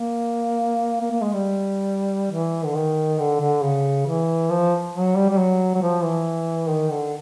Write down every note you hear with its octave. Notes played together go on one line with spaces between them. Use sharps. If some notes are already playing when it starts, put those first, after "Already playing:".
Already playing: A#3
A#3
A#3
G#3
G3
E3
D3
D#3
D3
D3
C#3
E3
F3
F#3
G3
G3
F#3
F#3
F3
E3
D#3
D3